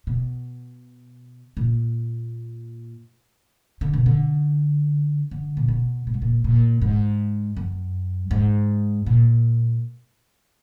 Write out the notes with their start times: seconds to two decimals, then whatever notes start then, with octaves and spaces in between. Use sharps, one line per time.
0.07 B2
1.57 A#2
3.81 D3
3.93 B2
4.06 D3
5.31 D3
5.57 A#2
5.68 B2
6.07 A#2
6.14 G#2
6.22 A#2
6.44 A#2
6.82 G#2
7.57 F#2
8.31 G#2
9.06 A#2